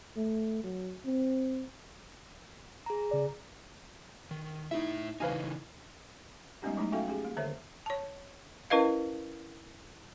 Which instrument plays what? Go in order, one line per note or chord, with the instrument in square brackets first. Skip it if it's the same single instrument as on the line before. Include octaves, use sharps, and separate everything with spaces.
[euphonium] A3
F#3
C4
[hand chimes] G#4 A#5
[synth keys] C#3 D5
[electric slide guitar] D#3
[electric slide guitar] A2 E5 [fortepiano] D#4 E4
[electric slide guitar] C#3 E3 D#4 [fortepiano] B4 F5 G#5
[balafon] G3 G#3 B3 C#4 D#4 G4
F#3 G#3 A3 D#4 E4
C#4 F#4 A4 E5 F5 G5
C#4 G4 G#4
A#3
D3 D#3 C5 C#5 E5
C#5 A5
C#4 E4 A#4 B4 D#5 F5